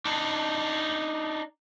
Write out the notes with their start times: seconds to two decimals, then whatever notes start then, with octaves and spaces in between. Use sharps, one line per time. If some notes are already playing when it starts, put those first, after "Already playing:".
0.05 D4 D#4